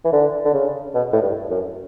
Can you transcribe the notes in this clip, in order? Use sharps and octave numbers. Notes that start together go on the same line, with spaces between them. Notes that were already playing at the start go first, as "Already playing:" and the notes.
E3
D3
D3
C#3
B2
A2
G2
F#2